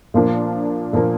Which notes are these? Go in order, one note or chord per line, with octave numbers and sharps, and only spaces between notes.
A#2 F3 A#3 D4
A#2 F3 A#3 D4